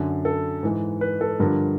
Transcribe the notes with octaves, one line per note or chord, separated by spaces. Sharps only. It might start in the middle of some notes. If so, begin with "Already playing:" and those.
Already playing: F#2 D3 F#3
A4
G#2 E3
B4
A4
G2 D3 F3 A#4